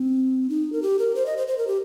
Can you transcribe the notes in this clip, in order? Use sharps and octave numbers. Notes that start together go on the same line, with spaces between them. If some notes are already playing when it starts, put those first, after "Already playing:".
Already playing: C4
D#4
A#4
G4
A#4
C5
D#5
C5
C5
A#4
G4